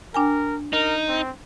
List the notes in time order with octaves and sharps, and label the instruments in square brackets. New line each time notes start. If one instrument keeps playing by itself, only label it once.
[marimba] D4 G5 G#5 [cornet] A#4
[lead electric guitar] D#4 [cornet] A#4
[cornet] C4